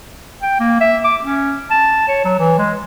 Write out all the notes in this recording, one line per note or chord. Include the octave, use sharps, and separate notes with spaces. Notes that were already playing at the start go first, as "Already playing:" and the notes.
G5
A#3
E5
D6
C#4
A5
C#5
F#3
E3
G#3